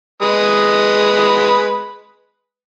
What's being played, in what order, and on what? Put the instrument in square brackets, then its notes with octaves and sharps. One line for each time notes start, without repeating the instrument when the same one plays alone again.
[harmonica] G#3 B4 D#6